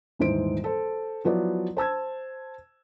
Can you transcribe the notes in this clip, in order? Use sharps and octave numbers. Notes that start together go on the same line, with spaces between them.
D#1 G#2 E3 C5 D7
A4 C5
F3 F#3 B3 E4 B4 D5
C5 A5 E6 G#6